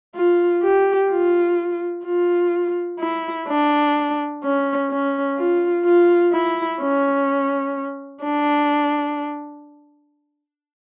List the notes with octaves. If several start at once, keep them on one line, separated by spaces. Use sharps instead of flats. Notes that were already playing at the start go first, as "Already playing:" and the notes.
F4
G4
F4
F4
E4
D4
C#4
C#4
F4
F4
E4
C#4
D4